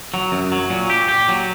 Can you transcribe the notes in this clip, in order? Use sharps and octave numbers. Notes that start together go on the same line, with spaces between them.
F#3
F#2
F#3
A#2
G4
G4
F#3